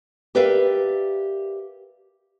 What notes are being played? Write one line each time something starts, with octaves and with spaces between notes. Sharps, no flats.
G4 A#4 B4 D5 E5 F5